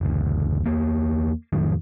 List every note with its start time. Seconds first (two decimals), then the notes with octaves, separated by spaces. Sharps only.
0.01 F#1 D2
0.66 E2 E3 A#3
1.53 F2 A2 D#3 F#3